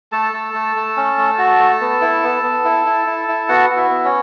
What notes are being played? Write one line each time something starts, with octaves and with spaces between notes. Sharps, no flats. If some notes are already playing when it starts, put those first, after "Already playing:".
A3 A4 A5
A3
A3
A3
C#4
A3
F#4
A3
B3
E4
B3
B3
E4
E4
E4
E4
B3 F#4 F#5
F#4
E4 E5
B3
C#4 C#5